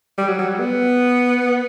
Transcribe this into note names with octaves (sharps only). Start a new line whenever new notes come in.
G3
F#3
F#3
G3
B3